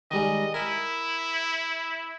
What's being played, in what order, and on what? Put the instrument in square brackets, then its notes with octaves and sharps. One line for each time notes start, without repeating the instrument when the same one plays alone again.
[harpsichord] D#3 G3 G#3 [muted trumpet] D#5
[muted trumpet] E4 [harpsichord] A#4